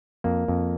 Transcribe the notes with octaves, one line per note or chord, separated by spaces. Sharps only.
F2 A#3
F2